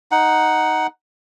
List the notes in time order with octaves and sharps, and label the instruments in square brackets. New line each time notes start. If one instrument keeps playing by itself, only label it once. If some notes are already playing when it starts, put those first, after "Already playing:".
[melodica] D#4 F#5